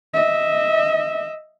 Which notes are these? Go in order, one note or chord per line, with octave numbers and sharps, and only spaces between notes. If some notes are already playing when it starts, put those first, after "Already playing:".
D#5 E5